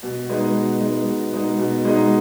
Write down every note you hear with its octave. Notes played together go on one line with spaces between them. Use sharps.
B2
G#3 B3 D#4
B2
G#3 B3 D#4
B2
G#3 B3 D#4
B2
G#3 B3 D#4